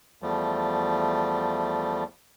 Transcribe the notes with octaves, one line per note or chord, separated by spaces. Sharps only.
E2 F3 G3 A3